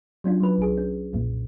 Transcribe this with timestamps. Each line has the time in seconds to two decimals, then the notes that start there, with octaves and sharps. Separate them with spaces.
0.24 F#3 C#4 D4 F4
0.40 F#3 B4
0.58 B1 G#4
0.78 C#4
1.13 B1 F2 A#2